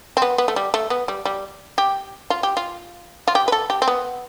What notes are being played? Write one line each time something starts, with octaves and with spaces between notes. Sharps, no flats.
C4
B3
B3
A3
G3
A3
B3
G3
G3
G4
F4
G4
F4
F4
G4
B4
A4
G4
C4
B3